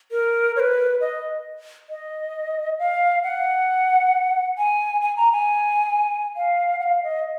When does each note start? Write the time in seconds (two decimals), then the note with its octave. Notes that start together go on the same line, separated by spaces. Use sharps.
0.12 A#4
0.56 C#5
0.60 B4
1.01 D#5
1.90 D#5
2.79 F5
3.23 F#5
4.58 G#5
5.01 G#5
5.17 A#5
5.32 G#5
6.36 F5
6.80 F#5
6.83 F5
7.03 D#5